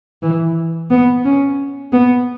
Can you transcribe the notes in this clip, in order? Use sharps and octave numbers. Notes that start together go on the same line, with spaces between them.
E3
B3
C#4
B3